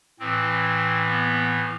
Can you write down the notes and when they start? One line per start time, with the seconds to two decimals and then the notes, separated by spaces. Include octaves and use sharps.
0.19 A2 E3 C4
1.06 B3